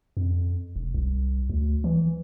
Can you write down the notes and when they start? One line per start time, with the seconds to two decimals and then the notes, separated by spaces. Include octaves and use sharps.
0.17 F2
0.76 E1
0.94 C2
1.50 D2
1.84 E3